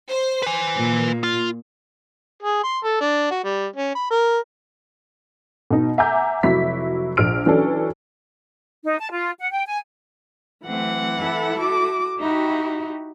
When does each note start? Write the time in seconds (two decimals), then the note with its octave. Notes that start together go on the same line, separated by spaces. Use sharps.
0.10 C5
0.42 B4 G#5
0.77 A#2
1.23 F4
2.42 G#4
2.63 C6
2.84 A4
3.01 D4
3.31 F#4
3.44 G3
3.76 C#4
3.95 B5
4.10 A#4
5.70 B2 D#4
5.98 E5 F#5 G#5 A#5 D6 G6
6.43 F1 F#3 E4 F#4 B6
7.17 A#1 C5 F6 D7
7.46 E3 F#3 C#4 D4 A4
8.85 D#4
8.99 A5
9.12 F4
9.40 F#5
9.52 G5
9.67 G#5
10.65 E3 F#3 A3 C4 F#5
11.18 E4 A4
11.59 F#4 D6
12.20 D#4 E4 F#4 G4